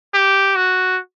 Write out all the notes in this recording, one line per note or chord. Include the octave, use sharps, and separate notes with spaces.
G4
F#4